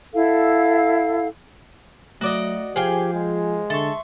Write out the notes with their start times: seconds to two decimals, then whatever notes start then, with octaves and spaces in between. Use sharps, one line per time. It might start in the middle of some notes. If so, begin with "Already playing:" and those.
0.14 E4 A4 F5 F#5
2.21 F#3 A3 F#4 D5 D#5
2.76 F3 G4 G#4 C5 F5 G5
3.14 G#3
3.70 D3 A4 E5 C6 C#6